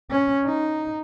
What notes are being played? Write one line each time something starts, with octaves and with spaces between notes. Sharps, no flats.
C#4
D#4